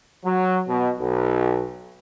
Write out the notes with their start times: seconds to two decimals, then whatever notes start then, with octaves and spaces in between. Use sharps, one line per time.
0.24 F#3
0.67 B2
0.99 B1